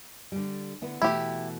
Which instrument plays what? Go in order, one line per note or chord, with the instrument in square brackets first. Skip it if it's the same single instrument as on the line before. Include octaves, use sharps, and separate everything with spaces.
[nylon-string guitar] D3 G3
D3 B3 E4
[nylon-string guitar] B2 E3 A3 [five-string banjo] E4 G4